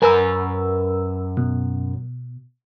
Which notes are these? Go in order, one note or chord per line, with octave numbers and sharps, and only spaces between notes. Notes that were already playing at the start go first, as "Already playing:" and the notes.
F#2 A#4 B4 G#5 E6
B2